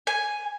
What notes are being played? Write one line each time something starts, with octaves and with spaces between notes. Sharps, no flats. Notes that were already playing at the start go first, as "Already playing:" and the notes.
G#5